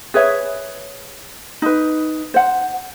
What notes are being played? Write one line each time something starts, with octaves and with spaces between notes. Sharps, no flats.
G#4 B4 C#5 E5
D#4 B4
C5 F#5